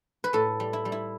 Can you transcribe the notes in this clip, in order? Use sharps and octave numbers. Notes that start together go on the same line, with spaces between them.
B4
A2 A4
G3
E4
G3
E4